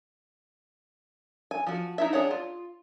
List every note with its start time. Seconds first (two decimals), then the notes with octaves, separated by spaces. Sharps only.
1.51 G#5
1.67 F3 F#4
1.98 D#4 E4 E5
2.13 D4 G#4 C#5 F#5
2.31 F4